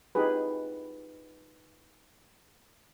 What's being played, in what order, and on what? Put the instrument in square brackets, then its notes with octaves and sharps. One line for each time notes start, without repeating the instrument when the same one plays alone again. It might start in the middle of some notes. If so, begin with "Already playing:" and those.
[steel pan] D#4 F4 G4 G#4 B4